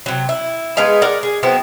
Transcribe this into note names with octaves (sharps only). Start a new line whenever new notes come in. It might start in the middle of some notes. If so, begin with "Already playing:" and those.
C3 F#3
E4
G#3 B3 D#4 F5
A#4 D5 F#5
G#4
F#3 B3 C4 E4